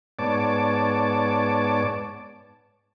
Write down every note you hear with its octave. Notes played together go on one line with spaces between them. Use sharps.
G#2 B3 C#5 D5 A5 D6